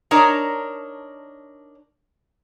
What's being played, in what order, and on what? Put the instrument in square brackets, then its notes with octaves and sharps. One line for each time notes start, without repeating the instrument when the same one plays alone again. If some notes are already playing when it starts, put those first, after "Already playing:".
[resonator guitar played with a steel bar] D4 D#4 A#4 C#5